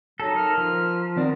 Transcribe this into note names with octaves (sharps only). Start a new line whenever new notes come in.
F#3 D#4 A4
A#3 A#5 F6
F3
D#3 B3 C4 A#4 D5